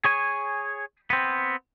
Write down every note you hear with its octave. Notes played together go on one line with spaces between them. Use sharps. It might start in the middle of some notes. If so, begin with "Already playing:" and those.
G#4 C#5 G#5
B3 C4